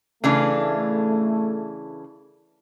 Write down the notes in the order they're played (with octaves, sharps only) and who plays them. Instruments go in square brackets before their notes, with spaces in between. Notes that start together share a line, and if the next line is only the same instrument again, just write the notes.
[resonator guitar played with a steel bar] C#3 E3 D4 [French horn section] A3